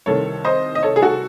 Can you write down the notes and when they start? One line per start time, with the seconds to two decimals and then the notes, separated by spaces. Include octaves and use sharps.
0.06 C2 C3 D#3 A4 C#5
0.45 C5 D#5
0.75 D#5
0.83 A4 C#5
0.96 G#4
1.02 F#4 A4